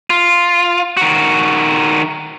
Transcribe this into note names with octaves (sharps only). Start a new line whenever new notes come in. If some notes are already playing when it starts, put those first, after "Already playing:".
F4
D#3 F#4